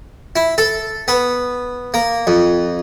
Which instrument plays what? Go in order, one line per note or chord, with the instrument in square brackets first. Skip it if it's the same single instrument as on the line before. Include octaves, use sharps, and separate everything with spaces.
[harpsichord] E4
A4
B3
A#3
F2